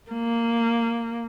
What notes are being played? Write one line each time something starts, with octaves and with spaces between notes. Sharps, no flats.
A#3